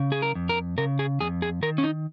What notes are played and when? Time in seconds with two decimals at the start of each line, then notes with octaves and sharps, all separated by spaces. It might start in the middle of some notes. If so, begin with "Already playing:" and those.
Already playing: C#3
0.12 G#4
0.22 A#4
0.35 F2
0.49 A#4
0.78 C#3 A#4
0.99 G#4
1.21 F2 G#4
1.42 G#4
1.62 D#3 A#4
1.78 C#4
1.84 D#4